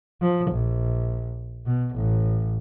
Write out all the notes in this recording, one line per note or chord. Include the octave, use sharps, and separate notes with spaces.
F3
A#1
B2
A1